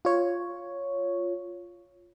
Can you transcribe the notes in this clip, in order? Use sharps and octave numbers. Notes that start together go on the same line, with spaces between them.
F4 C#5